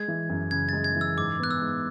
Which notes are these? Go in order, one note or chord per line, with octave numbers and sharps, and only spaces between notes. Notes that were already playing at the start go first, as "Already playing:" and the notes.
Already playing: G#3 G#6
E3
F#2
C#3 G#6
G#3 A6
G#6
E3
E6
G#2 D6
B3 F#6
E6
G#2